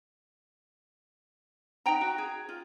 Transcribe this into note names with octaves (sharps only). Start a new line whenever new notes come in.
D#4 F#5 G5 A#5
F#4
G#4
F4